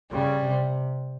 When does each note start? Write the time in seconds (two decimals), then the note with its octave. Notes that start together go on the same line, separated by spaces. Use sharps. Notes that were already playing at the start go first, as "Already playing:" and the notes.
0.11 C#3 G3
0.45 C3